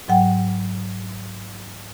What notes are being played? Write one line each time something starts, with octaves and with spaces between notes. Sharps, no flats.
G#2 F#3 F#5 G5